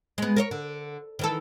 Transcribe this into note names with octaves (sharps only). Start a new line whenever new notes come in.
G#3 B3
A#4 C5 C#5
D3
D#3 E3 A4